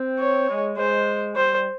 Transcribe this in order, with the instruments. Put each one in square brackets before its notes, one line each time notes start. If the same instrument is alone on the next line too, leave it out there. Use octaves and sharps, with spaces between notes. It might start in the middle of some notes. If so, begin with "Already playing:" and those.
Already playing: [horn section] C4
[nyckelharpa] C#5
[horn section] G#3
[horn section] G#3 [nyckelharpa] C5
[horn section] G3 [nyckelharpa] C5